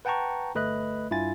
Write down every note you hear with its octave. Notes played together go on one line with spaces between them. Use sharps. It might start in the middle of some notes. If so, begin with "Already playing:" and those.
B4 F#5 G5 A5 A#5 C#6
G1 A3 B4 D#5 B5 F#6
G2 E4 F4 G#5 A6